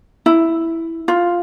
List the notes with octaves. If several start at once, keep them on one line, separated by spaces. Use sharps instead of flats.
E4
F4